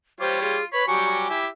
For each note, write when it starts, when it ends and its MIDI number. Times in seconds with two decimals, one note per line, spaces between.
0.21 0.56 55
0.21 0.37 65
0.21 0.56 67
0.21 0.42 72
0.21 0.56 73
0.42 0.64 65
0.42 0.64 68
0.73 0.86 71
0.73 0.87 73
0.73 0.86 83
0.88 1.27 54
0.88 1.27 55
0.88 1.27 67
0.88 1.37 80
0.88 1.23 85
1.30 1.46 64
1.30 1.46 67
1.30 1.48 76